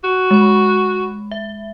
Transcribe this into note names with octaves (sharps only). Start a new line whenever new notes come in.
F#4
G#3 B5
E5